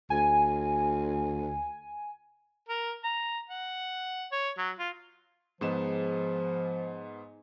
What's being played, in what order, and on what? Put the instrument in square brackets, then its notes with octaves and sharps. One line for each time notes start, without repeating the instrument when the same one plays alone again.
[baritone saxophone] D2 [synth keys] G#5
[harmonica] A#4
A#5
F#5
C#5
F#3
F4
[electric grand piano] G#2 B3 E7 [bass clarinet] F3 [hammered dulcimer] D#4 G#4